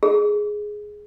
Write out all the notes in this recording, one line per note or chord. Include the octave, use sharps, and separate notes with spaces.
G#4